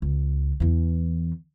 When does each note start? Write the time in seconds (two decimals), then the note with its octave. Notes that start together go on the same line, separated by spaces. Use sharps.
0.02 C#2
0.60 E2 E3